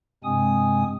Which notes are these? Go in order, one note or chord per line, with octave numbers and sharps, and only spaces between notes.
G2 C3 G#3 C4 G#5 D#6